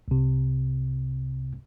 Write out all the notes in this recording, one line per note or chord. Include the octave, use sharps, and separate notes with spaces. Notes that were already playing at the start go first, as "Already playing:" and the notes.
C2 C3